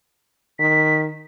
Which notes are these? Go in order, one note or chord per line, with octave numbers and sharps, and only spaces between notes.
D#3 B6